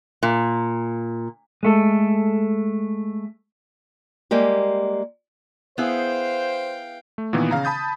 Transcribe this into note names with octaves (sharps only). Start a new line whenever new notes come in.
A#2
G#3 A3 A4
G3 G#3 A#3 G4
B3 E4 G#4 C5 F5 G5
A3
A#2 D#3 E3 B3
C#3 F5 A#5
A5 B5 D#6 G6 A6